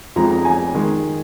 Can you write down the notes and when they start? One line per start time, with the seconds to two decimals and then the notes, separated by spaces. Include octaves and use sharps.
0.16 F2 F3 G#3 A#5
0.30 A#5
0.45 G#5
0.75 D#3 G#3